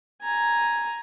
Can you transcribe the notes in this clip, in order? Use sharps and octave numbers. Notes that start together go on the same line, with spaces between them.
G#5 A#5